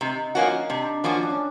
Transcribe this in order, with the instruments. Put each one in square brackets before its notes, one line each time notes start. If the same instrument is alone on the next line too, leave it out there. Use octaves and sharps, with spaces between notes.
[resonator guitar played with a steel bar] C3 [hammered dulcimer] D#4
[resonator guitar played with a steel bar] F3 A#3 C#4 F#4
[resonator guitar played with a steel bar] C3 [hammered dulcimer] D4
[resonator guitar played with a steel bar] F3 A#3 C#4 F#4
[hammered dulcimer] D4
C#4